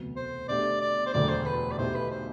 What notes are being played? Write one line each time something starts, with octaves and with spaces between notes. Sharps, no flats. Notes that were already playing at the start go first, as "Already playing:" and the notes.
Already playing: E1 D2 C3 F#3 B3
C5
B2 A3 D4 G4 D5
D5
C5
E1 D2 D3 F#3 A3 D5
C5
B4
D5
B1 B2 A3 E4 G4 C5
B4
C5